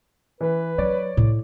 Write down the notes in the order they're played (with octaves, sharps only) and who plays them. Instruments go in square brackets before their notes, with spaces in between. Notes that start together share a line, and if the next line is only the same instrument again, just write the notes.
[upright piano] E3 [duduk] B4
[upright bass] F#3 [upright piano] C#5 D5
[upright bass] A2